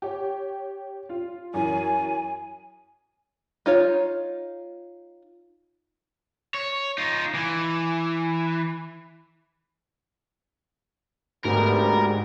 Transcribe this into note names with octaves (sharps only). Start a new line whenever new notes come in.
G4 C#5
F4
F#2 E3 G#5
D#4 F4 C#5
C#5
D#4 F4
E3
D2 G#2 C3 G3 B3 A#4